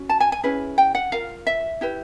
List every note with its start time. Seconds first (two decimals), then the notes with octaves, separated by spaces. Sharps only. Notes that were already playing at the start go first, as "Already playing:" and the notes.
Already playing: C#4 F#4
0.09 A5
0.20 G#5
0.32 G#5
0.43 C#4 E4 G#4 B4
0.78 G5
0.95 F#5
1.12 F4 A#4 F5
1.47 E5
1.81 E4 G4 B4